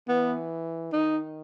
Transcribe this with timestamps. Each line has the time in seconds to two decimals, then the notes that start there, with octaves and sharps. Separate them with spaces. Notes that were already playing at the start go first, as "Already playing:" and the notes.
0.08 E3 B3
0.92 D#3 D#4